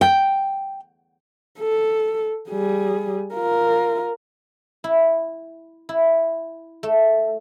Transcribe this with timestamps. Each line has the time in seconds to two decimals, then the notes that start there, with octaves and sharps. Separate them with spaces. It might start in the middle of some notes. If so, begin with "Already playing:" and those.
0.01 G5
1.60 A4
2.49 G3 G#4
3.35 F4 A#4
4.84 E4
5.89 E4
6.83 A3